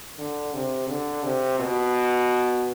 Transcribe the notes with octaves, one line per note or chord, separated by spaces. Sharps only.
D3
C3
D3
C3
B2